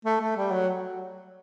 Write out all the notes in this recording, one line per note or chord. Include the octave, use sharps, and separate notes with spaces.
A3
A3
G3
F#3